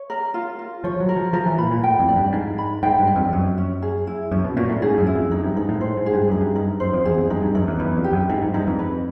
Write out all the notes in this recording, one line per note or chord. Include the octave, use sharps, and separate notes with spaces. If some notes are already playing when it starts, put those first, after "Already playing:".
Already playing: C#5
A#4
F4
F4
F3 C#5
F#3
A#4
F3
F3 A#4
E3
A#2 B5
A#2
A2 G5
F2
D5
G2
G#2 A#4
B5
G#2 G5
G2
D5
F2
F#2 C#4
C#4
G#4
E4
F#2 C#4
B2
A#2 C#4
A2
G#2 G#4
F#2
E4
F2
F#2 D#4
G2
G#2 D#4
A2
A2 C5
G#2
G#4
G2
F#2 D#4
G2
D#4
F#2 C5
F2
E2 G#4
F2
G2 D#4
G2
F#2 D#4
E2
E2 B4
F2
G4
F#2
G#2 D#4
G#2
G2 D#4
F2
B4